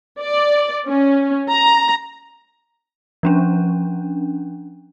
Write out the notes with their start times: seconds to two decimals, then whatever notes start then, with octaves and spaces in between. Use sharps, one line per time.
0.21 D5
0.87 C#4
1.49 A#5
3.23 F3 C#4 D4